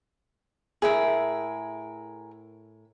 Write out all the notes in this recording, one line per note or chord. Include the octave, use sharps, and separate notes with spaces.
A2 G#4 A#4 E5